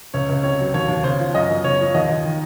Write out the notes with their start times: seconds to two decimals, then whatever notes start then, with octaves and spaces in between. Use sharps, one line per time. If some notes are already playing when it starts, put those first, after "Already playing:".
0.14 C#2 C#5
0.29 C#2
0.43 C3 C#5
0.59 F#3
0.74 D#2 C#5
0.89 D#2
1.03 C#3 C5
1.19 F3
1.34 F#2 D#5
1.49 F#2
1.64 C#3 C#5
1.79 F3
1.94 D#2 D#5
2.09 D#2
2.25 D#3